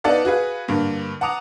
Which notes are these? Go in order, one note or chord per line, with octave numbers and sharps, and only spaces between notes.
B3 D#4 A4 D5 F5 F#5
F#4 G#4 B4 F5
G2 D3 A#3
F#5 A5 A#5 D6 D#6 F7